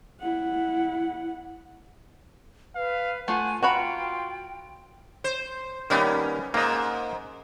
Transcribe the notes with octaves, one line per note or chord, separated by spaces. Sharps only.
E4 F#5
B4 F5
A3 F4 F#5 G#5
F4 F#4 F#5 G5 A#5 B5
C5
D#3 G3 A#3 B3 C#4
G#2 A#3 D#5